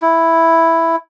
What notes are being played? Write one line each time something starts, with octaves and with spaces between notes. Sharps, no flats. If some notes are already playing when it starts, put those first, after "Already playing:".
E4